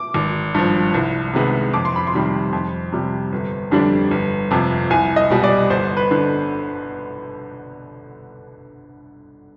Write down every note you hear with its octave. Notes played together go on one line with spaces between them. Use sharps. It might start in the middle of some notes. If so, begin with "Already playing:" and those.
Already playing: D6
G#1
G2 F3
C2
C3 D#3 G#3 B3
F2 D6
C6
B5
C6
C3 D#3 G3
F2
C3 G3
G1
F2 D3 G3 D4
G1
F2 C3 F3
C2 G#5
D#5
B2 G3
D5
G1 C5
B4
D3